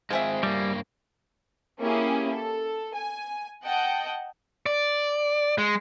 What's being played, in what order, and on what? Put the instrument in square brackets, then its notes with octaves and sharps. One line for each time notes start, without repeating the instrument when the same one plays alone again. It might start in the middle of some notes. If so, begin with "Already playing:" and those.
[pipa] F3 G#4 E5 [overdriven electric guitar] G#3 C4
[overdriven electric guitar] G2 A#3 [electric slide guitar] G3
[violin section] A#3 C#4 E4 G4 G#4
A4
G#5
D#5 F#5 G5 A5
[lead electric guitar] D5
G#3